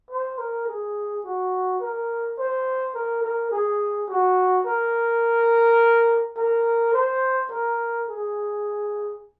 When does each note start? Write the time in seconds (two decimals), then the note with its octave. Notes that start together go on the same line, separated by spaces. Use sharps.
0.11 C5
0.38 A#4
0.68 G#4
1.25 F#4
1.81 A#4
2.39 C5
2.95 A#4
3.23 A#4
3.51 G#4
4.09 F#4
4.66 A#4
6.37 A#4
6.93 C5
7.52 A#4
8.09 G#4